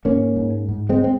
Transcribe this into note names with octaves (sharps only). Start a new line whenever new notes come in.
G#2 A#3 C#4
G#2
G#2
G#3 C4
C4